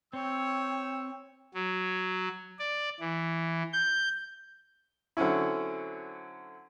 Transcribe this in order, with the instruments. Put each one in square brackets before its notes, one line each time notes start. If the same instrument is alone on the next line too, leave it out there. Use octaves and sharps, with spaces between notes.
[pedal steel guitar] C4 [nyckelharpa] C#5 [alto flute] G5 [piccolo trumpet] E6
[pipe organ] F#3
D5
E3
G6
[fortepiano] D3 F#3 C4 C#4 E4